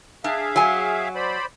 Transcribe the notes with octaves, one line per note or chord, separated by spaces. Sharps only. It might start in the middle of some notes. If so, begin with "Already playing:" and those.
D4 G#4 E5 F5
F#3 G#5
C5 D5 B5